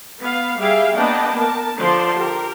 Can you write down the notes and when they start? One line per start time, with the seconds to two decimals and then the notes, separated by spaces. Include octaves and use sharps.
0.21 B3 F5
0.60 G3 G#4 E5 F5 G5
0.95 A#3 B3 D4 D#5 G5 A5
1.36 A#4 A5
1.78 D3 F3 C5 D5 A5 C6
2.16 G4 A#4